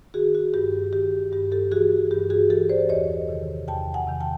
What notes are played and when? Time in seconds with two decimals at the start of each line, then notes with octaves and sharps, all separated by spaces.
0.14 D#3 F#4 G#4
0.35 F#4
0.54 G2 G4
0.93 D#3 G4
1.32 G2 G4
1.52 G4 A4
1.71 E3 F#4 G#4
2.11 G2 G4
2.30 F#4 G#4
2.50 E3 G4 A4
2.69 C5 D5
2.89 E2 C#5 D#5
3.29 C3 D#3
3.68 E2 G5 A5
3.94 F#5 G#5
4.08 C3 D#3
4.20 G5 A5